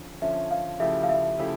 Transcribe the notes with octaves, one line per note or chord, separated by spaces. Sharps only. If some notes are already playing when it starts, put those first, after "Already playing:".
Already playing: D3 F3 C#4
D3 F3 C#4 E5
F5
C#3 F3 A3 E4 G4 E5
F5
E5
C#3 F3 A3 E4 G4